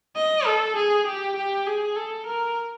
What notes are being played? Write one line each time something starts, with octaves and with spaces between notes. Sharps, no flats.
D#5
A4
G#4
G4
G4
G#4
A4
A#4